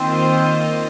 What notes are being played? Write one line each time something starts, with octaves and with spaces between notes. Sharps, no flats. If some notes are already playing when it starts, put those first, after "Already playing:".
Already playing: D#3 A#3 C4 F4 C5 D#5